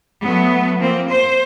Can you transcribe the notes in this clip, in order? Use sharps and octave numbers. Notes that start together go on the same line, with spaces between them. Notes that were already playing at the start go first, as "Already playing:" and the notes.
F#3 A3 B3
F3 A#3 C4
C5